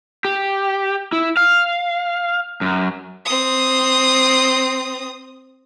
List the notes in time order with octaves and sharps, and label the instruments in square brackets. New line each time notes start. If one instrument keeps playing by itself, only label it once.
[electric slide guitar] G4
E4
F5
F#2
[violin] C4 D#6